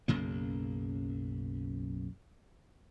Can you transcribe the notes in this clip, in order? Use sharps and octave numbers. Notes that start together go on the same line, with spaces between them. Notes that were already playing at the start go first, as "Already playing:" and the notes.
B1 F#2 C#3 A#3